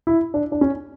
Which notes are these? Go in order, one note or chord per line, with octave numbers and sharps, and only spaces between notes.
E4
D4
D4
C#4